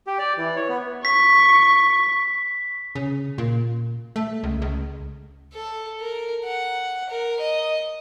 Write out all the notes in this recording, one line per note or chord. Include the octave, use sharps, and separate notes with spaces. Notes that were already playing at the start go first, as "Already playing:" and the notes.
G4
D5
E3
C#5
B3
C#6 B6
C#3
A#2
A3
C#2
C#2
A4
A#4
F#5
A#4
D#5